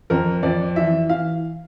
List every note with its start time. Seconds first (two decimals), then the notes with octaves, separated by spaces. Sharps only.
0.10 F2 A#4
0.43 F2 D5
0.76 E3 E5
1.09 E3 F5